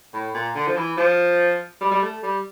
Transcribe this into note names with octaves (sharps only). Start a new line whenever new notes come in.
A2
A#2
D3
F3
E3
F3
G3
G3
A3
G3